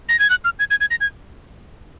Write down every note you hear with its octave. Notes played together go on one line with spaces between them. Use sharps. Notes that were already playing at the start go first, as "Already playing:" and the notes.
A#6
G#6
F#6
F6
G#6
G#6
G#6
A#6
G#6